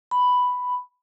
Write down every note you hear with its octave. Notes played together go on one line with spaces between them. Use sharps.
B5